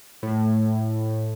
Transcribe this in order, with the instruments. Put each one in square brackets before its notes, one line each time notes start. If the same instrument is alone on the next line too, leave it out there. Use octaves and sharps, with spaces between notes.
[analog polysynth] A2